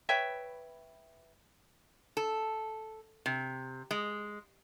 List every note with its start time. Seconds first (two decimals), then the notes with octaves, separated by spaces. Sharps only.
0.09 B4 C#5 E5 G5
2.17 A4
3.26 C3
3.91 G#3